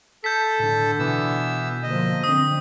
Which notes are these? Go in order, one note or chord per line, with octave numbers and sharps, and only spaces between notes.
A4 G6 B6
A2 D3
B2 E3 B3 E6
D3 F3 A#3 D#5
F#2 D3 C4 D#6